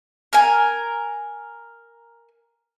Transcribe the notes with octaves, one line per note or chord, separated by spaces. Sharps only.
A#4 G#5